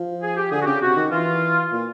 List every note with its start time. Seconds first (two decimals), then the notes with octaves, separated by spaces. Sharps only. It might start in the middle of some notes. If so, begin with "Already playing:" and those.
Already playing: F3
0.22 G#4
0.36 G4
0.51 D3 G#4
0.62 F#4
0.66 C#3 G4
0.82 C3 F#4
0.96 D#3
1.11 E3 F4
1.72 A#2